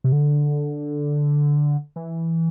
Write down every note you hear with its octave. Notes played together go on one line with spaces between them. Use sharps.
C3
D3
E3